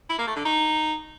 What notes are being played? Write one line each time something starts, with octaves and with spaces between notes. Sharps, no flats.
E4
A#3
A3
D3
D#4